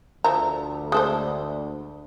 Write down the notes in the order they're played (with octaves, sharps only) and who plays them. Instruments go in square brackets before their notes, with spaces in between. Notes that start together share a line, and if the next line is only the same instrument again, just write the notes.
[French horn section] D2 [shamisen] F3 E5 A#5
[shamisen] G#3 A4 C5